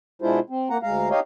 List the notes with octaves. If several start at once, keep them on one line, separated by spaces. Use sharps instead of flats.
B2 G#3 D4 E4 F4 C5
C4
A#3 F#5 A#5
D2 G#3 F5 A#5
D#4 G4 C#5 D#5 F5